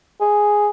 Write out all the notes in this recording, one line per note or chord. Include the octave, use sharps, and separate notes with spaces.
G#4